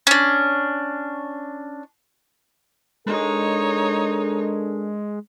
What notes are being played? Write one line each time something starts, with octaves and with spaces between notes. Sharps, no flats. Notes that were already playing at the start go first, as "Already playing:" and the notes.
C#4 D4
G#3 D4 D#4 A4 A#4 C#5